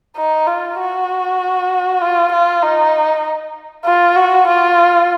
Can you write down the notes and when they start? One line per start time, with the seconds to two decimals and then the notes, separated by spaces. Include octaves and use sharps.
0.16 D#4
0.47 F4
0.79 F#4
2.01 F4
2.32 F4
2.63 D#4
3.85 F4
4.16 F#4
4.47 F4